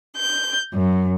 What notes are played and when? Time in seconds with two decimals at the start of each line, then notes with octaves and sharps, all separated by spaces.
0.16 G6
0.74 F#2